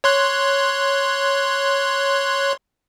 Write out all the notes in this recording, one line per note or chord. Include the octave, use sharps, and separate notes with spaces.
C#5 C6 F#6